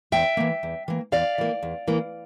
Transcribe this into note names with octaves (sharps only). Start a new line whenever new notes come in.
E2 E5 G5
E3 A#3
E2
E3 A#3
E2 D5 F5
E3 A#3
E2
E3 A#3